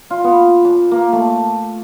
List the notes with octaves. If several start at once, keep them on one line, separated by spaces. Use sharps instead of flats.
F4
B3
D6
A#3
A3
D6